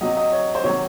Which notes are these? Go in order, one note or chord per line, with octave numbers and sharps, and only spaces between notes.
C3 F#3 D#5
D#5
C#5
C5
C3 D#3 F#3 C#5